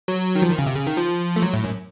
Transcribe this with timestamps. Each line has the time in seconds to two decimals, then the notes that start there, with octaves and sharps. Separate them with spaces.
0.08 F#3
0.35 D#3
0.42 F3
0.50 D#3
0.58 C#3
0.67 C3
0.76 C#3
0.87 D#3
0.97 F3
1.36 A3
1.42 F#3
1.54 A2
1.64 F#2